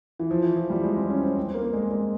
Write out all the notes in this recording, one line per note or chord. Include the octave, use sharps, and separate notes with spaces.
E3
F3
E3
F3
G3
G#3
C4
C#4
C4
C4
C4
A#3
A#3
G#3
G#3